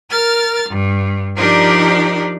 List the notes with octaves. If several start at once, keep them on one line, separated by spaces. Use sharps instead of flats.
A#4 F6 A6
G2
F3 D4 D#4 G4 A#4 D5